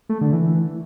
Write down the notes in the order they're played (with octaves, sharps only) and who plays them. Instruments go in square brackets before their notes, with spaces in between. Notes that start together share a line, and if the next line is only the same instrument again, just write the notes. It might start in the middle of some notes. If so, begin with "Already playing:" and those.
[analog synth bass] A3
D3
E3